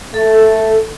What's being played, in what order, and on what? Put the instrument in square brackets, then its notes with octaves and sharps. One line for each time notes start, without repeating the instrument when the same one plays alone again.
[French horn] A3 [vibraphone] A4